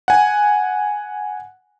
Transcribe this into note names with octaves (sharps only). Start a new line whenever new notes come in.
F#5 G#5